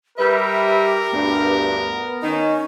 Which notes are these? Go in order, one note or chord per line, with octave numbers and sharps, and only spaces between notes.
G3 G4 A#4 B4 E5
D2 G2 B3
D#3 C#4 D#4